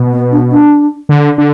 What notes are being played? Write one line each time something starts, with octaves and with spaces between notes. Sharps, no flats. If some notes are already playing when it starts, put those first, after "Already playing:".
Already playing: B2
B3
D4
D4
D3
D3